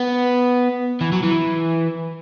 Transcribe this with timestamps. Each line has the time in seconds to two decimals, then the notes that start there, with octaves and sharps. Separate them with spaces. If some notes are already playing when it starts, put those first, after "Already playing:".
Already playing: B3
1.01 E3
1.12 F#3
1.23 E3